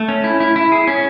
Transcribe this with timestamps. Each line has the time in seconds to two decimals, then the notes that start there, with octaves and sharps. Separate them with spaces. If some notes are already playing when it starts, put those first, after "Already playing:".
Already playing: A3
0.09 C#4
0.24 E4
0.40 E4
0.56 E4
0.72 G#4
0.87 C#4